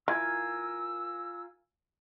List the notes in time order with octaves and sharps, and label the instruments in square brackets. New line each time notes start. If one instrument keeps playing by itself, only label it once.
[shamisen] E3 [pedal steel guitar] F4 A#4 G#5 [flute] E6